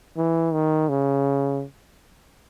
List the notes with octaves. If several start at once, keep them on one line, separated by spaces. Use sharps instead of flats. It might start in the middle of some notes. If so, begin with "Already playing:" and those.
E3
D#3
C#3